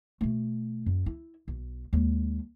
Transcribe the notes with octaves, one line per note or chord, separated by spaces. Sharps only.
B2 A3
F#2
E4
B1
D#2 G#3